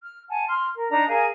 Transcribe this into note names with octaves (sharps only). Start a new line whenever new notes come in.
F6
F#5 G#5 A5
C6 F6
A#4
D4 D#4 A5 A#5
G#4 A#4 F5 G#5